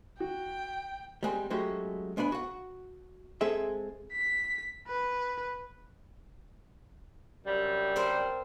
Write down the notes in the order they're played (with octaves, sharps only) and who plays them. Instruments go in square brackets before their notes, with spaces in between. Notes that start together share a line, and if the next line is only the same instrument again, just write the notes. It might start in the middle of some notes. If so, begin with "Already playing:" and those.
[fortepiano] F#4 [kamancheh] G5
[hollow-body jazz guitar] G3 G#3 A#3 C4
F#3 G#3 A3 C#4 F#4 G4
G#3 B3 D4 F#5 B5
F#4 F#5
G#3 C4 G#4 A4 E5
[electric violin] B6
B4
[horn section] F#2 C3 G3
[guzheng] C4 A#4 C5